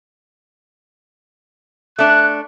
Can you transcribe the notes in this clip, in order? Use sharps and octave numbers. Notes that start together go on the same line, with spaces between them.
A3 D4 F#6